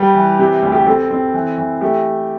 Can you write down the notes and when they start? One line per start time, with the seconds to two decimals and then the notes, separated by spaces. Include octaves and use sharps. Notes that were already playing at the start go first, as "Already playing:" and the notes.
Already playing: G3 G4 B4
0.15 E3
0.39 C3
0.62 D2
0.72 G4
0.86 C4 A4
1.11 C4
1.34 E3
1.58 E3
1.81 A3 G4